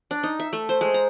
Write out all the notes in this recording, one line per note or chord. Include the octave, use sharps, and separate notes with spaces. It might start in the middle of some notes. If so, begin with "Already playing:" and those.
D4
D#4
E5
A3
C5
G#3
A#5